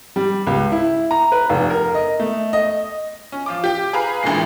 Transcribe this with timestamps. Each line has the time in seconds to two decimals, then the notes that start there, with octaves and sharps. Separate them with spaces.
0.16 G3
0.47 C#2
0.72 E4
1.11 A#5
1.32 B4
1.49 F1
1.70 A#4
1.94 D#5
2.20 A3
2.53 D#5
3.32 C#4
3.46 F3 F4 D6
3.64 G4 G5
3.93 G#4 B4 F5 A#5 B5
4.23 A1 A#2 D3 E3 G#3 C7